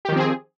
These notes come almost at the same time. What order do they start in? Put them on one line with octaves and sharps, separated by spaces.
G4 D#3 F3 C4 G#4